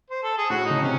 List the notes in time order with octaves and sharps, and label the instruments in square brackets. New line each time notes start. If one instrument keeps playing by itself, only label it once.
[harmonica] C5
A4
G#4
[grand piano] A2 [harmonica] F#4
[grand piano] C#3 [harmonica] D#4
[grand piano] C3 [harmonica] C#4